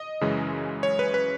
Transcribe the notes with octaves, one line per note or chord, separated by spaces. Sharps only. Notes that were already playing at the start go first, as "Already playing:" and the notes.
Already playing: D#5
F#2 C#3 E3 G#3
C#5
B4
B4